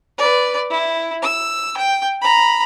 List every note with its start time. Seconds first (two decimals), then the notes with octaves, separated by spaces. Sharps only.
0.18 B4 D5
0.70 E4
1.22 E6
1.77 G5
2.22 A#5 B5